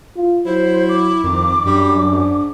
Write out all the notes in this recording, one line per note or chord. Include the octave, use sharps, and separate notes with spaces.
F4
F#3 E4 C5
D6
F2 D#3
F#2 G3 D4
G#2